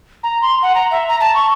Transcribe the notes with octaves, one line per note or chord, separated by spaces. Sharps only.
A#5
C6
F#5
A#5
E5
A#5
A5
C#6